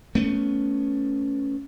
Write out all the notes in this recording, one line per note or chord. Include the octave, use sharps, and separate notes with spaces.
A3 B3 C#4